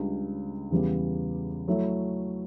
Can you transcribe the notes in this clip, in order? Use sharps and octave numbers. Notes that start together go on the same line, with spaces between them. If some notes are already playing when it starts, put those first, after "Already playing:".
Already playing: C#2 C#3 G3 D4
E2 C#3 G3 B3
F#3 A3 E4